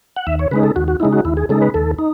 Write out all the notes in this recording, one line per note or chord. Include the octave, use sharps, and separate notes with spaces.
F#5
D#2 E5
C#5
C#3 G#3 D#4 B4
A4
D#2 F#4
F#4
C#3 G#3 D#4 E4
F#4
D#2 E4
G#4
C#3 G#3 D#4 A4
B4
D#2 A4
D#4